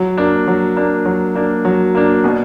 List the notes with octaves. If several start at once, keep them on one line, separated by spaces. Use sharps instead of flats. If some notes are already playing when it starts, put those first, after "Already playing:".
Already playing: F#3
A#3 D4
F#3
A#3 D4
F#3
A#3 D4
F#3
A#3 D4
B2